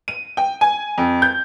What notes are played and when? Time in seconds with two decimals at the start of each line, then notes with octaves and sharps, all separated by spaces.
0.08 D#7
0.37 G5
0.61 G#5
0.98 F2
1.22 G6